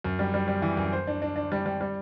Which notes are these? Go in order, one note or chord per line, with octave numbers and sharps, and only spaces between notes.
F#2
G3
G3
G3
E3
F#2
C5
D4
D4
D4
G3
G3
G3